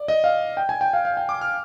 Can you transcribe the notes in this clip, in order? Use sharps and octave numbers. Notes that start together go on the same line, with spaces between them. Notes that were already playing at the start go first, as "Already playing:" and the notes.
Already playing: D5
D#5
F5
G5
G#5
G5
F5
F5
G5
D6
F6